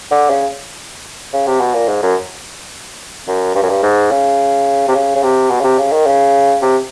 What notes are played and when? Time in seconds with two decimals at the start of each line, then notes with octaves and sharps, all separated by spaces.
0.11 D3
0.30 C#3
1.33 C#3
1.47 C3
1.60 B2
1.74 A#2
1.88 G#2
2.03 F#2
3.28 F#2
3.55 G2
3.63 F#2
3.69 G2
3.83 G#2
4.11 C#3
4.88 C3
4.94 C#3
5.16 C#3
5.23 C3
5.51 B2
5.60 C#3
5.64 C3
5.78 C#3
5.92 D#3
6.07 C#3
6.62 C3